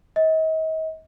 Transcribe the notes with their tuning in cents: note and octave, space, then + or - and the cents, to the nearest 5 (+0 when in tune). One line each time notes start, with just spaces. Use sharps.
D#5 +40